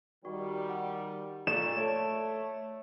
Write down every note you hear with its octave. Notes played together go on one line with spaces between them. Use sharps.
D#3 G3 F#4
F#5
A#2 A4 D5 C#6 E7
A3 C#5 G#6 D7